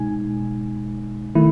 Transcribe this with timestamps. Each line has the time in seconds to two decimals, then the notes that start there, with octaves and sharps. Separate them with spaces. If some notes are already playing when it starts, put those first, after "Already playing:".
Already playing: B2 G#3 D#4 G#5
1.35 D#3 A3 E4